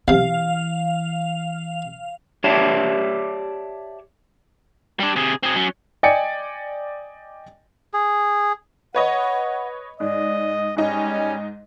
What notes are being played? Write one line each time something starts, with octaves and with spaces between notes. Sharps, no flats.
B1 C3 E3 F5
G4 C#5 D5 E5 A5
G3 D4
C3 G#4
C4 G#4
F#3 C#4
D5 D#5 G5 G#5 C#7
G#4
B4 C#5 D#5 F#5
G#2 D5 D#5
G#2 G3 C#4 D#4 G#5